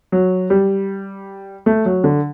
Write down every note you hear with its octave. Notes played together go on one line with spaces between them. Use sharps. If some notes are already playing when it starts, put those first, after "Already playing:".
F#3
G3
A3
F#3
D3